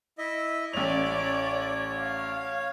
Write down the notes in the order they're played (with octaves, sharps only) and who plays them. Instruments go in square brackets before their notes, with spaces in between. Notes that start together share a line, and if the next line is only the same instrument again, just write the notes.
[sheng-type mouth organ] E4 D#5 E5
[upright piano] A1 F7 [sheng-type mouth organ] C#5 [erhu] D5
[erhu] F5